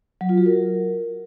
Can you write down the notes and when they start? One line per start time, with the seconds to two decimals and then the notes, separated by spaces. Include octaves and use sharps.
0.21 F#3
0.29 F4
0.38 F#4
0.46 A#4